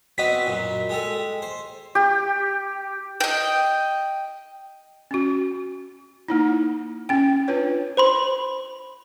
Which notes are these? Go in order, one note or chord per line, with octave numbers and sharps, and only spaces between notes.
B3 C4 F#4 D#5 B6
F#2 A#2
G#3 G4 A4
C5
G4
D#5 G5
C#4 F#4
A#3 D#4 E4
C#4 G5
D4 F4 B4 C#5
C5 B5 C6